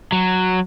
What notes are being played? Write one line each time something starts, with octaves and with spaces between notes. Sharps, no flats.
F#3